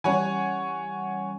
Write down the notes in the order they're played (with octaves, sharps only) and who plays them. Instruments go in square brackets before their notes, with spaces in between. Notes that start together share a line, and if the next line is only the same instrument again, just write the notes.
[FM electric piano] E3 G3 C#4 [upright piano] C#5 F#5 G#5